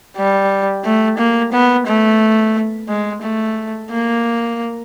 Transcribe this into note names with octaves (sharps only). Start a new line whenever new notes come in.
G3
A3
A#3
B3
A3
G#3
A3
A#3